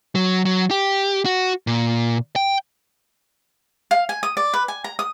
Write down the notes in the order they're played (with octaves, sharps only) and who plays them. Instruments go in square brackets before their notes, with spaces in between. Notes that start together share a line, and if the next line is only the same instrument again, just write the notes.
[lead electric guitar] F#3
F#3
G4
F#4
A#2
G5
[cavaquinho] F5
G#5
D#6
D5
B4
G#5
A#5
D#6